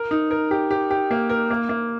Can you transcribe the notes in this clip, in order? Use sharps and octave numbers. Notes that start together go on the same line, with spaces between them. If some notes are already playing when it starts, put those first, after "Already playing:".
Already playing: A#4
D#4
A#4
G4
G4
G4
A#3
A#4
A#3
A#3